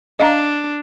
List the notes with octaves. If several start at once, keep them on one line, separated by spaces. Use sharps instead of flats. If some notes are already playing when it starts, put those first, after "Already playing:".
D4 D#5 F5 A#5